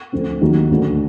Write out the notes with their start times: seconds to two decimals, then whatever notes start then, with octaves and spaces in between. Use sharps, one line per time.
0.12 D2 D3 F3 A3 C4
0.41 D#2 D#3 F#3
0.71 D2 D3 F#3